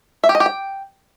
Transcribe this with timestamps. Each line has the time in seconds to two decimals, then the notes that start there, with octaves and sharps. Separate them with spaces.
0.24 E5
0.29 G4
0.35 D#5
0.40 G4
0.46 G5